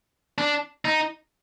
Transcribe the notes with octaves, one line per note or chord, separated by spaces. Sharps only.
D4
D#4